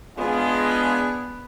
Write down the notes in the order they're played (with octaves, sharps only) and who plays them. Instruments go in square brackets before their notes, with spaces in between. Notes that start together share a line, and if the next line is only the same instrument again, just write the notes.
[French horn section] G#3 F4 [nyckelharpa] B3 [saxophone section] D4 G#4